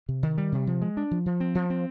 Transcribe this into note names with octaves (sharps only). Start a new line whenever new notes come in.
C3
D#3
G3
C3
F3
G#3
D4
F3
F3
C4
F3
C4